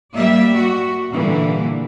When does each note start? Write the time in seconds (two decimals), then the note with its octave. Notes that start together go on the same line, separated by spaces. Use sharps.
0.14 G3 A#3 D5 E5
0.57 F#4
1.10 A#2 D3 E3 G3